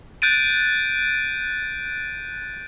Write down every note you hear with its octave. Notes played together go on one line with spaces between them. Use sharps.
F#6 G6 A6 D7 D#7